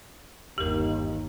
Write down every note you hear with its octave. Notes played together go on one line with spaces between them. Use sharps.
G1 D#2 G4 A#4